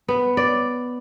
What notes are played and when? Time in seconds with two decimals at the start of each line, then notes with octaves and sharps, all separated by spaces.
0.08 B3
0.37 D5